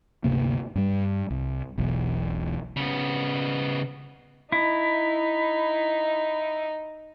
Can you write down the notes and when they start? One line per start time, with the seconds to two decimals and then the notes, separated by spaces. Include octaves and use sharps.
0.24 G1 D2 C3 A#3
0.75 G2 G3
1.30 C2
1.78 E1 B1
2.76 C#3 B3
4.52 D#4 E4